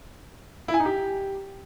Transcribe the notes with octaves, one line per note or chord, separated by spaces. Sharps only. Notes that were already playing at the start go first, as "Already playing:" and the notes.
E4
G#5
D#4
G4